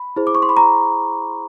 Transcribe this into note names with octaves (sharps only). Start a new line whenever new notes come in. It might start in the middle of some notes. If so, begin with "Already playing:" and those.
Already playing: B5
E4 G#4 C5
D6
C#6
C6
B5
A#5